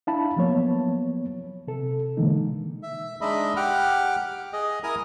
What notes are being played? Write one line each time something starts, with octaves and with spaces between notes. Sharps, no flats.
D4 E4 E5 F5 A5 B5
F3 F#3 A#3 B3 C#5
C3 A4
B2 D3 E3 G#3 A#3 D#4
E5
G#3 D4 D#4 D#5 E5 B5
G4 F#5 D6 F6
G#4 D#5
E4 A#4 G#5 A#5 D#6